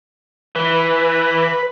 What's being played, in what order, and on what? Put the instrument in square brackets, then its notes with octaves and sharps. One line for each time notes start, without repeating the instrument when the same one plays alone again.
[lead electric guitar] E3 [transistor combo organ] B4